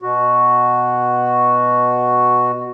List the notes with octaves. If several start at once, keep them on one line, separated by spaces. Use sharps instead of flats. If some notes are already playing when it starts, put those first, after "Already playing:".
B2 F#4